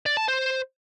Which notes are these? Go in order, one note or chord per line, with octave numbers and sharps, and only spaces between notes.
D5
A5
C5